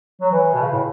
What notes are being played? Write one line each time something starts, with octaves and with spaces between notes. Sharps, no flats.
F#3
E3
B2
C#3
A2